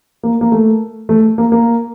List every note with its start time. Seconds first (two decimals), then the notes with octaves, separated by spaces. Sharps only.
0.23 A#3
0.41 A#3
0.52 A3
1.09 A3
1.38 A#3
1.52 A#3